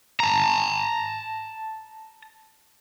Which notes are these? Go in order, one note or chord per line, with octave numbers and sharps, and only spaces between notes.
A5 A#5